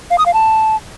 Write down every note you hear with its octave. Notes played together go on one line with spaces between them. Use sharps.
F5
D#6
F5
A5